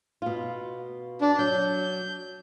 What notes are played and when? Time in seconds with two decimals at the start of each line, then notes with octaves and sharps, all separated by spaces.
0.22 B2 F4
1.21 D4
1.39 F#3 G6